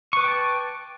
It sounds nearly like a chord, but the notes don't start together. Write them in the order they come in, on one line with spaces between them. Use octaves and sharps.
C#6 B4 D6 G5 A5